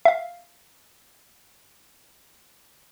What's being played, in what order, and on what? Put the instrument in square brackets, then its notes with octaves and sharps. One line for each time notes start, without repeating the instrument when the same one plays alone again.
[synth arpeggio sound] E5 F5